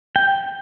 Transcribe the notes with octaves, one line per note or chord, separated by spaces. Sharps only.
G5